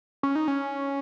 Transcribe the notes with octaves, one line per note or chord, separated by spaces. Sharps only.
C#4
D#4
C#4